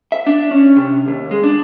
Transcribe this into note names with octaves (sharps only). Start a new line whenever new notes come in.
E5
D4
C#4
C3
D#2
G#3
D4